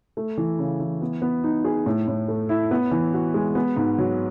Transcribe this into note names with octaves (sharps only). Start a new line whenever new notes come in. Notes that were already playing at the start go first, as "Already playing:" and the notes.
A3
E3
C#3
E3
B3
B3
D#4
G#4
A2
A2
A3
E4
B3
E3
F#4
G#3
B3
G#2
F#3